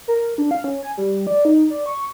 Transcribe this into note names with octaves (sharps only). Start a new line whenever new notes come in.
A#4
D4
F5
C#4
G#5
G3
D5
D#4
D5
C#6